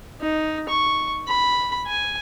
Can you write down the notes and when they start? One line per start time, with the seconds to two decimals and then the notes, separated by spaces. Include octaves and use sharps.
0.21 D#4
0.69 C#6
1.28 B5
1.87 G#5